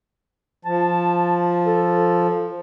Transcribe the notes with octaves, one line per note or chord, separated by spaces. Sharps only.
F3 A5
A4